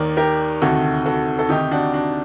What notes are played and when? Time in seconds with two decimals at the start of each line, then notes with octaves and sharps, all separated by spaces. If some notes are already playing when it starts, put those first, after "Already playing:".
Already playing: D#2 D#3 A#4 D5
0.17 G4 A#4
0.61 D2 C3 D#3 F#4 A4
1.06 F#4 A4
1.39 A4
1.49 D2 C3 D#3 D#4 G4
1.71 D4 F#4
1.93 D4 F#4